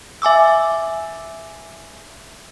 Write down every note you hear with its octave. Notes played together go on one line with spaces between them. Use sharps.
E5 G#5 D6 E6